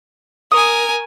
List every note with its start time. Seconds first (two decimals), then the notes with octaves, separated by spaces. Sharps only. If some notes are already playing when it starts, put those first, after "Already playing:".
0.52 A#4 G#5 C#6 D#6